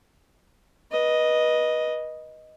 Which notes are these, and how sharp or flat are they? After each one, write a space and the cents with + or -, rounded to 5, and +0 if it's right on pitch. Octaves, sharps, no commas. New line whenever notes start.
B4 -25 D#5 +0